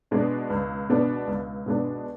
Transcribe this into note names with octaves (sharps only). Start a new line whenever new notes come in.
B2 G#3 B3 D4
C#2
B2 G#3 B3 D4
C#2
B2 G#3 B3 D4